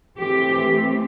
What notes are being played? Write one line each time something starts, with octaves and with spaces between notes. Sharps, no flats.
E3 A3 C4 G4